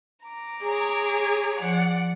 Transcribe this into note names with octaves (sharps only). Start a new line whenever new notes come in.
A#5 D6
G#4 C#5
F3 D5 F#5